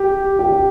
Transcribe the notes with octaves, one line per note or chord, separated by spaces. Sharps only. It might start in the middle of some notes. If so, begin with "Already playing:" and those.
Already playing: G4
G4